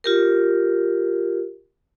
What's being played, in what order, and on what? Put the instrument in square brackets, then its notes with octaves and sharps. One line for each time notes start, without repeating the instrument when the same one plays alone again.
[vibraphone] F4 G4 A#4